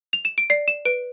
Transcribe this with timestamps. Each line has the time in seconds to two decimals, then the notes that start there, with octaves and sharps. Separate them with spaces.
0.13 F7
0.25 E7
0.38 D7
0.50 D5 C7
0.68 E7
0.85 B4 D7